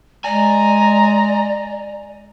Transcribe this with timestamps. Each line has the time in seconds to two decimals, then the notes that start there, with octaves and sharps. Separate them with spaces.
0.24 G#3 D5 G#5 A#5